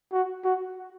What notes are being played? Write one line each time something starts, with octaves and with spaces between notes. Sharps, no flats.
F#4
F#4